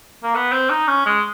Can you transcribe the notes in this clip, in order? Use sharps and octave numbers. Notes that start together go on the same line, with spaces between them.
A#3
B3
C4
D#4
C#4
G#3